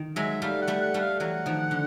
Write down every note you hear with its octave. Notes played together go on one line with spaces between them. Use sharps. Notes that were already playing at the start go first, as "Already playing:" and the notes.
Already playing: D#3
F#3 G#3 E5
G3 A3 F5
F#5
G3 A3
F#5
G3 A3
F5
E3 F#3 F#5
D#3 F3
D3